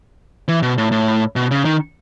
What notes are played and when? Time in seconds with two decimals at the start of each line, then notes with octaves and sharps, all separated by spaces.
0.48 E3
0.63 B2
0.78 A2
0.92 A2
1.36 B2
1.51 C#3
1.65 D#3